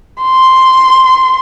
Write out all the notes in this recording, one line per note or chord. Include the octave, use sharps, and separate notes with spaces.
C6